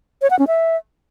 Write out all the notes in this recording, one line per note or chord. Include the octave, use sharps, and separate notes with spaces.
C#5
F#5
C#4
E5